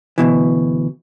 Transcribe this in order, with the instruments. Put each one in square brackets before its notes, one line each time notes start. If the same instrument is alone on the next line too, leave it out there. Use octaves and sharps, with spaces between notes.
[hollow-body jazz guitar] D2 G2 B2 E3